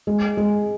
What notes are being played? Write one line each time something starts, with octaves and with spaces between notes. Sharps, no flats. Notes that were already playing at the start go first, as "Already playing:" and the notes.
G#3
G#3